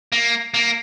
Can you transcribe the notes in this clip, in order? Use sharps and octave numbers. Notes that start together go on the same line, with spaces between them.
A#3
A#3